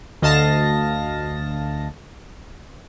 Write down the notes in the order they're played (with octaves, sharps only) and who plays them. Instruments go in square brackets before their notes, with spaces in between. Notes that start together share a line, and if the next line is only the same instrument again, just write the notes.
[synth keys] D2 D#5 F5 A5 A#6